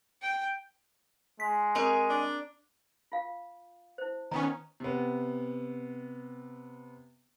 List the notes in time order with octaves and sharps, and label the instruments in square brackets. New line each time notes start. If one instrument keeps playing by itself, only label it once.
[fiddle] G5
[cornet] G#3 [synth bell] B6
[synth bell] C4 A#4 A#5 [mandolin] C#5 D#5 C#6
[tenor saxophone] D4
[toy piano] F4 F5
E4 C5
[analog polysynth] D#3 B3 C#4 [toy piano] A#5 D#6
[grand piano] C3 B3